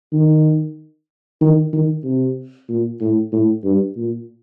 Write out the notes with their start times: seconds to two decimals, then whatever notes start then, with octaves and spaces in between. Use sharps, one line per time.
0.13 D#3
1.41 D#3
1.73 D#3
2.04 C3
2.69 A#2
3.01 A2
3.32 A2
3.64 G2
3.96 A#2